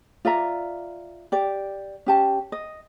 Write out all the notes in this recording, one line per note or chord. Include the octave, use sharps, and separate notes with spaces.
F4 D5 E5 A#5
G4 D5
C#4 G4 A5
D#5